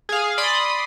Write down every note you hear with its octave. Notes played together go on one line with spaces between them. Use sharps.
G#4 F5
D5 B5 C6 D#6